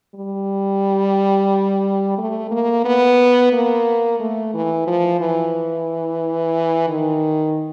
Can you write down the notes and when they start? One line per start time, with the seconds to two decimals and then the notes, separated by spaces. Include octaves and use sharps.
0.15 G3
2.18 A3
2.51 A#3
2.85 B3
3.53 A#3
4.20 A3
4.54 E3
4.87 F3
5.20 E3
6.89 D#3